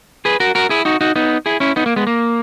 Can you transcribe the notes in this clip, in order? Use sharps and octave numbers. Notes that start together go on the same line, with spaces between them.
G#4 B4
F#4 A#4
F#4 A#4
E4 G#4
D#4 F#4
D#4 F#4
B3 D#4
E4 G#4
C#4 E4
B3 D#4
A#3
G#3 B3
A#3